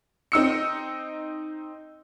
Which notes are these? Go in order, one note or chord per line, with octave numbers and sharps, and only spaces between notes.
C4 D#4 E6 C#7